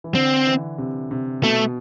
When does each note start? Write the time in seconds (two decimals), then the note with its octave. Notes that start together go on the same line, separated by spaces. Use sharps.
0.04 E3
0.14 D3 C4
0.47 E3
0.78 C3
1.11 C3
1.42 B2 A3